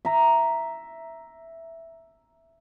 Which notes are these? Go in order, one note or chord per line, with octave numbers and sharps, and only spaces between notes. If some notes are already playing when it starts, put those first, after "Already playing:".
E5 A#5